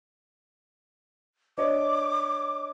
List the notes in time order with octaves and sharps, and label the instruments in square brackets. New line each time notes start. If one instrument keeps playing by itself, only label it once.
[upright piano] D4 C#5 D#5 [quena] D6